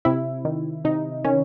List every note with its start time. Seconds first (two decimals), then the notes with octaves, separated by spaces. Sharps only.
0.05 C3 E4
0.45 D#3
0.85 C3 D#4
1.25 D#3 C#4